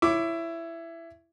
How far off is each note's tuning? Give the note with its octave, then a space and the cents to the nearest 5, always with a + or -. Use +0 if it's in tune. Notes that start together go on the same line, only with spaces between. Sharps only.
E4 +15 C#5 +0 D6 +0